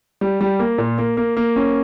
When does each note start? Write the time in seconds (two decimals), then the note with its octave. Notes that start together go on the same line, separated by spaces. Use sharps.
0.21 G3
0.41 G3
0.59 A#3
0.78 A#2
0.98 A#3
1.17 A#3
1.37 A#3
1.56 C#4